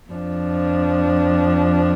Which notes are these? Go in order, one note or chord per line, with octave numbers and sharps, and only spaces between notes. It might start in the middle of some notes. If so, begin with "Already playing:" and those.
F2 F3 D4